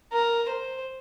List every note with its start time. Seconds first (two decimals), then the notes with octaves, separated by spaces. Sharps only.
0.13 A#4
0.49 C5